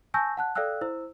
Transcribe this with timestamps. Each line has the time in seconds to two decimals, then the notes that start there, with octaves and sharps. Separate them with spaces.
0.14 G#5 A5 C#6 E6 G6 A#6
0.37 F#5 A5 F#6
0.55 A4 D5 F5 G5 E6 F#6
0.81 E4 C5 E6